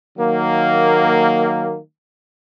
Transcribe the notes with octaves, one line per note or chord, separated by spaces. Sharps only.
D#3 F#3 A#3